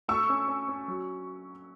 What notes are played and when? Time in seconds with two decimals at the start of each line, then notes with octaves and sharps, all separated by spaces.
0.08 A3 C#6 E6
0.29 C#4
0.48 C#4
0.68 C#4
0.88 F#3